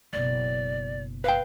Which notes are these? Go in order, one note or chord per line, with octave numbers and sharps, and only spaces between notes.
F#1 B2 D5
B4 F5 G5